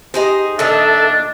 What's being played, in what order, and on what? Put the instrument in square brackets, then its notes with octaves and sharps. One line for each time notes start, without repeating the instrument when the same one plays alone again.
[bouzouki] D#4 G#4 C5 [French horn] G4
[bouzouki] A#2 D#3 [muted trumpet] D4 [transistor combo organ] A4 E5 [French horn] D#5